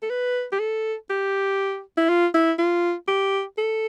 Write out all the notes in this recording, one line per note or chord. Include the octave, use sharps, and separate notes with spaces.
A4
B4
G4
A4
G4
E4
F4
E4
F4
G4
A4